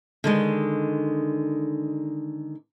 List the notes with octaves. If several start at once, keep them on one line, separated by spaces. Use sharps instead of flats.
D3 D#3 G#3